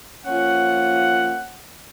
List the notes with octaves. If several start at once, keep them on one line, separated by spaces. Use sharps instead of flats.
F3 A#3 C#4 F4 F#5